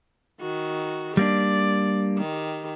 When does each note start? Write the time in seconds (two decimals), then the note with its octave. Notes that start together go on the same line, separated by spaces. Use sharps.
0.41 D#3 F#4
1.17 G3 A#3 D4 D5
2.17 D#3 G4